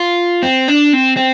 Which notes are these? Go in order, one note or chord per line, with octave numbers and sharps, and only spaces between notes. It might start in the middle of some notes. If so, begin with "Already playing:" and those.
Already playing: F4
C4
D4
C4
C4